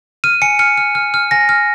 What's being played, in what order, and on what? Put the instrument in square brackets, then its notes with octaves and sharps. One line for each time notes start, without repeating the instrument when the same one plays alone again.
[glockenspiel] F6 D#7
G#5 C#7
F6 C#7
F6
F6
F6
G#5 A#6
F6